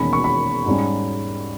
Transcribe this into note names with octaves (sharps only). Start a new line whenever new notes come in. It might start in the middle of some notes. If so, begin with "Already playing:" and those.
Already playing: E1 E2 D#3 A#3 C#4 B5
C#6
B5
G#2 G3 C#4